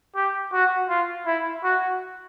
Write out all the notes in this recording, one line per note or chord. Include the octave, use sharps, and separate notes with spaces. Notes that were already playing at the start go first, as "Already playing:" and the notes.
G4
F#4
F4
E4
F#4